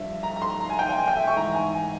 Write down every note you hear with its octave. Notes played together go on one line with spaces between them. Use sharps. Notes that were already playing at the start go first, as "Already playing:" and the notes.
Already playing: G2 F3 E5
A#5
A#5
C6
A#5
G#5
G5
G5
G#5
G5
E5
C#6
G#2 E3 A#5
G#5
G#5